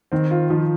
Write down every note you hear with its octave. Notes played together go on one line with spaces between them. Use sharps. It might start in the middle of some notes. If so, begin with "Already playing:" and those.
D#3 C4
F4
D#3 F3